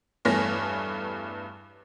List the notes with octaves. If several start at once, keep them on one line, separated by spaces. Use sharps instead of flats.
E2 G2 A3 B3 C#5 A#6